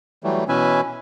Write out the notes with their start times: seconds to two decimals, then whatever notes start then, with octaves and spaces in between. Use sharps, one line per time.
0.24 E3 F#3 G3 A3
0.49 B2 E3 C#4 B4 E5 G#5